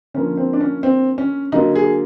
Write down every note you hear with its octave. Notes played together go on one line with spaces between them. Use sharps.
D3 F3 A#3 C#4
C4
D4
C#4
C4
C#4
D3 F#3 A#3 D#4
G#4